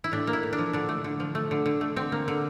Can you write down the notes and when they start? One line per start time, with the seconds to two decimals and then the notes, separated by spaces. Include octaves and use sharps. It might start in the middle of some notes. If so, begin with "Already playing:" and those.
0.04 E4
0.12 A2 D4
0.27 A#3
0.33 E4
0.43 A2
0.53 D4
0.59 F3
0.73 D3 D4
0.89 A3
1.04 D3
1.20 F3
1.35 A3
1.51 D3
1.66 D3
1.81 A3
1.96 D3 C4
2.12 A#3
2.28 D3